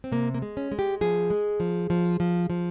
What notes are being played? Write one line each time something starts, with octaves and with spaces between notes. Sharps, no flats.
C4
C3 A#3
A#3
G#3
C#4
G#3
G4
F3 G#4
G#3
F3
F3
F3
F3